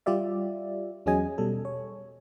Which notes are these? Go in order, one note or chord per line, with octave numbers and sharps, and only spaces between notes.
G3 F4 G4 D5 E5
E2 F#3 C#4 G#4 D#5 G#5
B2 G3 A4
C#5